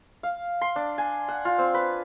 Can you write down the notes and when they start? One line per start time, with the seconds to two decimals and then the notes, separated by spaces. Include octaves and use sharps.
0.23 F5
0.61 C6
0.76 D4
0.98 G#5
1.28 F#5
1.45 F4
1.58 C4
1.74 B4